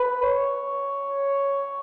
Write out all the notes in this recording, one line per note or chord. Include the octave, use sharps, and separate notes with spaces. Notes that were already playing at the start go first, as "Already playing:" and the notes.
Already playing: B4
C#5